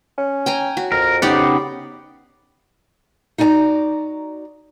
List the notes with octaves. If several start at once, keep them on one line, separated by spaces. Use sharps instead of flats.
C#4
G5 G#5 A#5
F#4
F2 A#4
C#3 B3 D#4 G4 D5 F#5
D#4 F#4 D5 G#5 A#5